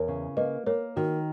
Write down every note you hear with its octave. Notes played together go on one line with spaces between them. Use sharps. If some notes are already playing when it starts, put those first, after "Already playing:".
Already playing: E2 A#4 C#5
C#3
A#3 B4 D#5
A#3 A#4 C#5
D#3 F#4 A#4